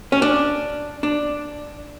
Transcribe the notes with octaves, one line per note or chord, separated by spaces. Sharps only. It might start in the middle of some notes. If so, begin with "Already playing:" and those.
C#4
D4
D4